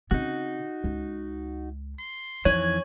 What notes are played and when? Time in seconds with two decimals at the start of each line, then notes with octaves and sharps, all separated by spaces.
0.11 C#3 C4 D#4 F#4
0.84 C#2
2.00 C6
2.45 F2 E3 D#4 C#5 G#5